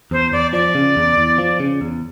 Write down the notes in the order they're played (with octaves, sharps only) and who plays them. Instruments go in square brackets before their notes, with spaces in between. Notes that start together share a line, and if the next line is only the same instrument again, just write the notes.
[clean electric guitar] E2 [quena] C5
[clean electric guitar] E2 [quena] D5
[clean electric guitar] F3 [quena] D5
[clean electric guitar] C#3
E2
E2
F3
C#3
E2